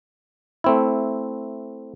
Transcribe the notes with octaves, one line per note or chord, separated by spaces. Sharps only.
A3 C4 E4